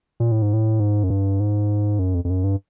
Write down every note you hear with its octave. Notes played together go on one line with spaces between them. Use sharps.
A#2
A2
G#2
A2
G#2
F#2
G2
G#2
F#2
F2
F2
F#2
G2